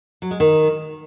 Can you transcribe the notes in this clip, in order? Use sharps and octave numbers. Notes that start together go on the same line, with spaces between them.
F#3
G#3
D#3